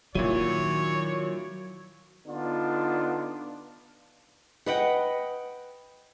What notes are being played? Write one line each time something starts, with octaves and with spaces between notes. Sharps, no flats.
A#2 D#3 F#3 E4 C#5 D#7
D3 B3 D4 D#4 F4
B4 D#5 F#5 G5